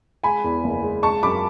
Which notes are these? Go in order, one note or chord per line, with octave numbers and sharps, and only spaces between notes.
G#3 G#5 B5
E2
F#1
G#3
G#3 A5 C#6
F#2 B5 D6